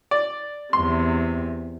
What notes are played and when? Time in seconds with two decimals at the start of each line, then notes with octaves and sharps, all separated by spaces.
0.11 D5
0.73 E2 C3 C6